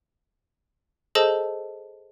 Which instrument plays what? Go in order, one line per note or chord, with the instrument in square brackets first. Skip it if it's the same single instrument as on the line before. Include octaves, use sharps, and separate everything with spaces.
[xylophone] G#4 A4 C5 D#5 A5